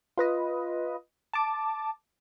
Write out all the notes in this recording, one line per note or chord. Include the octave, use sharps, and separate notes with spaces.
F4 B4 D#5
A5 D6